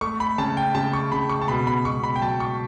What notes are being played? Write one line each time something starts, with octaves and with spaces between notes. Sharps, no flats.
A3 C#6
B5
C#3 A5
G5
C#3 A5
C#6
C#3 B5
C#6
A5
B2 B5
B5
B2 C#6
B5
G5
F#3 A5
C#6